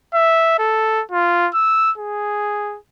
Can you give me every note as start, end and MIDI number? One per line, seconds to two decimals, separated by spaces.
0.14 0.56 76
0.59 1.02 69
1.12 1.49 65
1.55 1.91 88
1.98 2.77 68